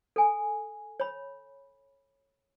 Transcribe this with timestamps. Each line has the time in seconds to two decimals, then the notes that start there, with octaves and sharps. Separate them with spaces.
0.16 A4 G#5
1.00 C#5 B5